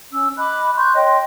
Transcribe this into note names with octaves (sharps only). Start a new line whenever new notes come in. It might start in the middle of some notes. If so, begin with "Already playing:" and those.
C#4 E6
D#5 B5 D6 F#6
C6 C#6 F#6 G6
C#5 D#5 G5 C6